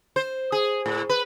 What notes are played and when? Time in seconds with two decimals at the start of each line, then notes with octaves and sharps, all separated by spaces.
0.16 C5
0.52 G#4
0.86 A2
1.09 B4